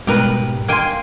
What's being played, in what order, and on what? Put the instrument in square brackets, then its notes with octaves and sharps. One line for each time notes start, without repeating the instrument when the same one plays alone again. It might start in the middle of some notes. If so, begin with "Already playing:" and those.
[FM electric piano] G#2 B2 G3 [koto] G4 A#4 B4
[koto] A#3 G5 G#5 [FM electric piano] F5 C6